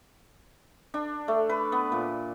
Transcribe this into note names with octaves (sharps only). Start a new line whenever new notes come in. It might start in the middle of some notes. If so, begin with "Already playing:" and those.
D4
A3
B4
B3
A#2